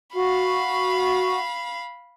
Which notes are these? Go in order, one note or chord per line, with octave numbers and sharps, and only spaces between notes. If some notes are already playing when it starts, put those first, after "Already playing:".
F#4 F5 B5